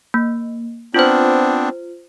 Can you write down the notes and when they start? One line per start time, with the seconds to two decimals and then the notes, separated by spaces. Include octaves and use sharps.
0.14 A#3
0.94 B3 C4 D4 F4 C5